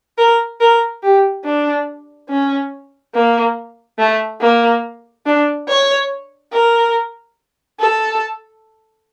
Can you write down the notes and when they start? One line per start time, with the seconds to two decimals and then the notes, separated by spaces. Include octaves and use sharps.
0.18 A#4
0.60 A#4
1.03 G4
1.45 D4
2.29 C#4
3.15 A#3
3.99 A3
4.41 A#3
5.26 D4
5.68 C#5
6.53 A#4
7.80 A4